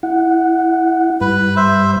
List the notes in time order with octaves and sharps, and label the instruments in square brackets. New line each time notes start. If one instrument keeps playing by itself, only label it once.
[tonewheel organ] E4 F#5
[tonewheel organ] G2 G3 [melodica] B4
[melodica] C5 E5